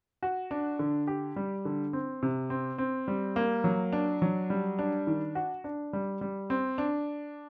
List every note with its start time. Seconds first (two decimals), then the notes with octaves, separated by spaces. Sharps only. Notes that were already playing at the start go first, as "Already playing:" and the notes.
0.23 F#4
0.51 D4
0.79 D3
1.07 G4
1.36 G3
1.65 D3
1.93 C4
2.23 C3
2.50 C4
2.78 C4
3.08 G3
3.36 A#3
3.64 F#3
3.93 D4
4.22 F#3
4.50 G3
4.79 D4
5.07 D#3
5.35 F#4
5.64 D4
5.93 G3
6.21 G3
6.50 C4
6.78 D4